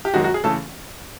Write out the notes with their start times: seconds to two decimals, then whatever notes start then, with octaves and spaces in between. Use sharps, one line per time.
0.05 G4
0.14 F#2 D#3 G#3 F#4
0.24 F#4
0.34 G#4
0.44 C#3 E3 A3 A4